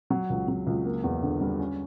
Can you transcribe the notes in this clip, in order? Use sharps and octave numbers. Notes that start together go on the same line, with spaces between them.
F#3
C#2
F#3
C#2
A#3
E2
D3
G3
C#4